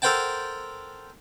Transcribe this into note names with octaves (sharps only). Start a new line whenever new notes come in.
A4 A#4 C5 F#5 G5 A5